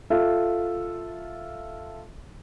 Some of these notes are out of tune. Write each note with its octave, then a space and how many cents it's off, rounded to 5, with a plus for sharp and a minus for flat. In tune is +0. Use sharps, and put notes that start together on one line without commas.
F4 +0 A4 +0 E5 +0